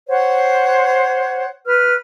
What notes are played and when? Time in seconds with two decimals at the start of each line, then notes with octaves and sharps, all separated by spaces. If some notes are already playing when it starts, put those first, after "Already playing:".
0.08 C5 C#5 F#5
1.66 B4 F6